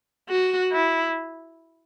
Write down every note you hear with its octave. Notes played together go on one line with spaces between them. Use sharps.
F#4
E4